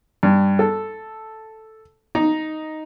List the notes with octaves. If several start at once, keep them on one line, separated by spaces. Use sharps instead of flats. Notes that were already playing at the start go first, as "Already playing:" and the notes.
G2
A4
D#4